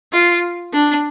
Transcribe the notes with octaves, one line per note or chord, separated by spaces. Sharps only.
F4
D4